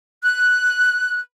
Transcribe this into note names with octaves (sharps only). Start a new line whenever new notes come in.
F#6